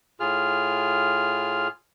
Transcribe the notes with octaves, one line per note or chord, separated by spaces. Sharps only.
A2 F4 G#4 F6